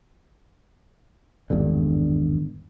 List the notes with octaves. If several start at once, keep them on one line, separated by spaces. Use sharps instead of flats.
G#1 E2 G2 D3